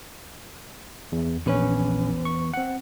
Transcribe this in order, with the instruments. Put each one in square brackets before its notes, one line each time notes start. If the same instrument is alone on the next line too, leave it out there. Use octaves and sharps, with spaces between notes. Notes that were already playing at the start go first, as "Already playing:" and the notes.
[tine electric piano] E2
[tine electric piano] A#1 C#4 [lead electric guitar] E2 B4
[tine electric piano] C#6
C4 F#5